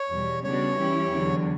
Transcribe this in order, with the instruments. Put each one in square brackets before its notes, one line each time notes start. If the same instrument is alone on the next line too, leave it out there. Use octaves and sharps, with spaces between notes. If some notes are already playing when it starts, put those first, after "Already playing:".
Already playing: [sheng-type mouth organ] C#5
[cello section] E2 B2 G3
[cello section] C#3 G3 B3 D4 F#4 [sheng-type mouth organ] C#5
[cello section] E3 G3 C#4 E4 G4
E2 D3 F#3